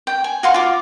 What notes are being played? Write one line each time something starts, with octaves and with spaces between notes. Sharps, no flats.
G5
G#5
F#4 F5 C6
F4 D6